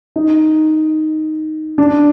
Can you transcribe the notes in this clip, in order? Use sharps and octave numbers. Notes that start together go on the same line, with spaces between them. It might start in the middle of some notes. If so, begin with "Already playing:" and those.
D#4
D4